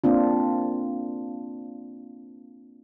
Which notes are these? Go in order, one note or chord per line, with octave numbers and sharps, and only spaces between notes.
A#3 C4 D4 F4